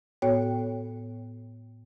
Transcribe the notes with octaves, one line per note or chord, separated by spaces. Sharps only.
A2 B3 F#4 C#5 G5